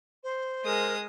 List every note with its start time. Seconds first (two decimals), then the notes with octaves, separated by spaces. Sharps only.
0.23 C5
0.65 G#3 A#4 D#6